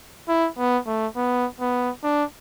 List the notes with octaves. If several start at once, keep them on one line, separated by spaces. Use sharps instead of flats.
E4
B3
A3
B3
B3
D4